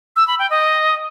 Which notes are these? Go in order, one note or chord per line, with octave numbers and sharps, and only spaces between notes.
E6
B5
G5
D#5